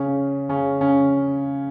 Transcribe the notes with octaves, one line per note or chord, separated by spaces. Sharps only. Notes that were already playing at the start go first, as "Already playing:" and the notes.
Already playing: C#3 C#4
C#3 C#4
C#3 C#4